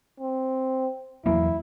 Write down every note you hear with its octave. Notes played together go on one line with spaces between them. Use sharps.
C4
E2 F#3 A#3 E4